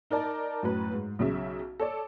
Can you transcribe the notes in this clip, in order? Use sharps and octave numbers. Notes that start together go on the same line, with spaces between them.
D#4 A#4 D5 A5
F#2 A2 B4
G#2
B1 C#3 E5
A4 C#5 D5